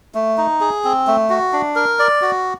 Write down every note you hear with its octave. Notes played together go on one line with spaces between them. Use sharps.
A3
D#4
G#4
C4
A3
F#4
D4
A#4
D5
F#4